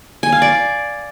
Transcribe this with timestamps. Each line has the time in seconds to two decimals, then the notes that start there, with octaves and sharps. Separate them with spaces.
0.23 G#5
0.32 F5
0.42 D5